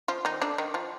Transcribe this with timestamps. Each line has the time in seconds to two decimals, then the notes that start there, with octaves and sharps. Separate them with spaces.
0.08 F3 F4
0.25 D#3 D#4
0.42 D3 D4
0.58 D#3 D#4
0.74 F3 F4